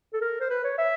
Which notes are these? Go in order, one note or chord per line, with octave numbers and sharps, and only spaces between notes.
A4
A#4
C5
B4
C#5
E5